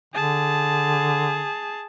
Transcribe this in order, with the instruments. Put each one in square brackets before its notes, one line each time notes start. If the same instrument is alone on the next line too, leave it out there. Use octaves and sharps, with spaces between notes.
[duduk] D3 [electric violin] G#4 A5